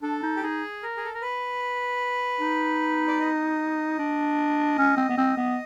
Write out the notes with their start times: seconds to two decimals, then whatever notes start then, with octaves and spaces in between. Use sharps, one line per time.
0.02 D4 A4
0.23 D#4
0.36 G4
0.43 D#4 G#4
0.83 A#4
0.97 G#4
1.05 A4
1.14 A#4
1.22 B4
2.40 D#4
3.08 D5
3.20 D#5
3.99 D4
4.78 C#4
4.97 C4
5.10 B3
5.18 C4
5.37 B3